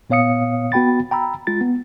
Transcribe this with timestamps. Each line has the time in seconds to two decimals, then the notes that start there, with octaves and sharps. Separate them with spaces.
0.10 A#2 B3 C#5 F5 D#6 C#7
0.72 B3 F#4 G5 B5 A6
1.11 G5 A#5 B5 E6
1.47 G#3 F4 A6
1.61 B3